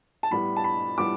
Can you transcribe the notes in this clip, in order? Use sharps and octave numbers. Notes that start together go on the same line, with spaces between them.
A5
A2 G3 B3 B5
A5
B5
A2 G3 B3 D6